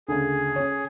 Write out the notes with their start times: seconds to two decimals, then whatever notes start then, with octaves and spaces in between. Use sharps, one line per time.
0.08 D2 C#3 G#4
0.56 C#4 C#5